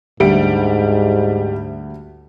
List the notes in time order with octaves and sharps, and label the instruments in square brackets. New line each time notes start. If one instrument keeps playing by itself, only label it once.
[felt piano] D2 E5 D7 [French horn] G#2 [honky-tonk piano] G3